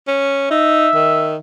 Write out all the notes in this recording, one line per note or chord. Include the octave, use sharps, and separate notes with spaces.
C#4
D#4 E5
D#3